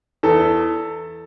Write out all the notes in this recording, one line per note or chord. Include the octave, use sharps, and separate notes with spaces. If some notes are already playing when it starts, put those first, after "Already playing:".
E2 A4